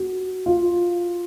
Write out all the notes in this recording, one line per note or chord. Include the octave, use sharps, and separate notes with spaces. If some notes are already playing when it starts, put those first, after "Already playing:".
Already playing: F#4
F4